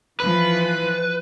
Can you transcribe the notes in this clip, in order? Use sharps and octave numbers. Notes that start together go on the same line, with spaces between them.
E3 F3 B4